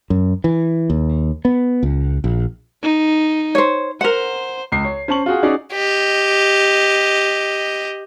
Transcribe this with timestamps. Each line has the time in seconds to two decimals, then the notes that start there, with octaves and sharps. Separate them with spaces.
0.10 F#2
0.44 E3
0.90 D#2
1.45 B3
1.83 C#2
2.24 A#1
2.83 D#4
3.55 C5 C#5
4.01 A#4 C5 F#5
4.72 C#2 C7
4.85 C#5
5.08 C#4 C5 A5 C#6 F#7
5.26 F4 F#4 G#4
5.43 C#4 D#4 F#4 G#4 D5
5.73 G4 D#5